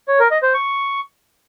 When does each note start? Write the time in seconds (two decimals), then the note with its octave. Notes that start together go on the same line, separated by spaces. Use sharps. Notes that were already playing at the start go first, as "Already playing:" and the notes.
0.08 C#5
0.20 A#4
0.31 D#5
0.43 C5
0.54 C#6